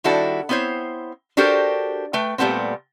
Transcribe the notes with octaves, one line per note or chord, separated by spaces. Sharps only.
D#3 G3 D4 E4 F#4 A4
B3 C4 E4 C5 C#5
D4 F#4 G4 A4 A#4 C5
A3 B4 G5
A#2 G3 A3 B3 C4